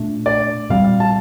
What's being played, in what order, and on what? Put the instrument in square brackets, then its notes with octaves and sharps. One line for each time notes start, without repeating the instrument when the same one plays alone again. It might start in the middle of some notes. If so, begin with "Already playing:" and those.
Already playing: [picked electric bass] A#2 A3 D4
[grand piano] D5
[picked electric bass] A#2 G3 C4 [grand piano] F5
[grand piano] A5